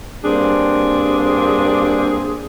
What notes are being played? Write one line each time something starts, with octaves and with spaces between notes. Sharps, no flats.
G2 A#3 C4 D4 G#4